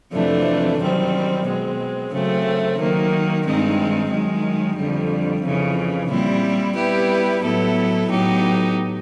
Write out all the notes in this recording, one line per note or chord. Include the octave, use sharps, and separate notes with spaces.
F2 C3 E3 A3 D4
F#2 D#3 G3 C4
B2 G#3 C4
F#2 C#3 F#3 A3 C4
D#3 F#3 A#3
G2 D#3 G#3 C4 D#4
F#2 D#3 G#3
F2 D3 G3
F2 C#3 E3
A#2 G3 C4 E4
G3 B3 E4 G4 B4
A2 F#3 B3 E4 A4
A2 F#3 B3 D#4 G4